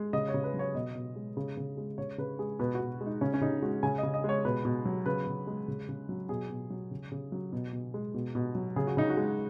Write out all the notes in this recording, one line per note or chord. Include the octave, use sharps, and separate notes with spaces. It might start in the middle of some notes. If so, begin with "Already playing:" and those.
Already playing: G#3
C#3 D#5
C#5
C#3
B4
F#3
C#5
B2 D#5
B2
G#3
C#3
C#3
G#3
C#3 C#5
C#3 B4
G#3 G#4
B2 B4
F#4
B2
G#3
D#4
C#3 C#4
C#4
C#3 D#4
G#3 F#4
C#3 G#5
C#3 D#5
D#5
G#3 C#5
B2 B4
B2
F#3
C#3 B4
C#3
G#3
C#3
C#3
F#3
B2 G#4
B2
F#3
C#3
C#3
F#3
B2
B2
G#3
B2
B2
F#3
C#3 G#4
F#4
C#3 D#4
F#4
G#3